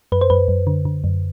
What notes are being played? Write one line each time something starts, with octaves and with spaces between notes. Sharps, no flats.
F#2 B4
C5
F#2 B4
F#2
D3
D3
F#2